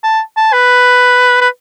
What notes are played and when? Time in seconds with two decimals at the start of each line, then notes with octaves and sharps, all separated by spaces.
0.04 A5
0.37 A5
0.53 B4
1.41 B4